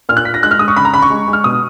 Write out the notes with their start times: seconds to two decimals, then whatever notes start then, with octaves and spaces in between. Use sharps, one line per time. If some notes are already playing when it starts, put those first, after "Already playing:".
0.09 A#2 F6
0.17 F#6
0.25 A#2 B6
0.34 A#6
0.43 G#3 F#6
0.51 F6
0.59 G#3 D#6
0.68 C#6
0.76 C#3 B5
0.85 A#5
0.94 C#3 B5
1.02 C#6
1.10 G#3
1.28 G#3
1.33 F6
1.44 B2 D#6